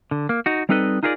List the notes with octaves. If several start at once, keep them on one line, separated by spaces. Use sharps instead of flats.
D3
A#3
D#4 F#4
G3 C4 D#4 A4 B4 D#5
D#4 F4 G#4 A#4 C5 D5